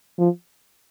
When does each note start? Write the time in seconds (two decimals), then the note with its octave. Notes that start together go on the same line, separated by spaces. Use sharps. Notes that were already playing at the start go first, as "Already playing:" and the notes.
0.19 F3